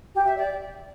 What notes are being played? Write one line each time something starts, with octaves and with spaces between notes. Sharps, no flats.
G4
E5
D5